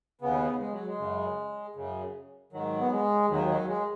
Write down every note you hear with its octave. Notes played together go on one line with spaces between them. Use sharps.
D#2 C#3 B3
G#3
F#3
G#3
F#2 C#3
F#2 C#3
G#2 D#3 F#3
B3
G#3
D#2 D#3 F#3
F#3
G#3